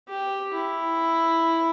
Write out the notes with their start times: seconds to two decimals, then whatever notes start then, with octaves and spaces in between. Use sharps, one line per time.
0.08 G4
0.54 E4